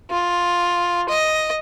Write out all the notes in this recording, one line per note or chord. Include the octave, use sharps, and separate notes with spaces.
F4
D#5